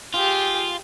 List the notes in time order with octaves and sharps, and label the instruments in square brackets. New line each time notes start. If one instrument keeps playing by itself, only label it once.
[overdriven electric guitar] F4 [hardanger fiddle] G4 G#4